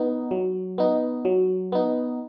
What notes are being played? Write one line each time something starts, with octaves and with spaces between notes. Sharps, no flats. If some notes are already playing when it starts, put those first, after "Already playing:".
Already playing: B3 D#4
F#3
B3 D#4
F#3
B3 D#4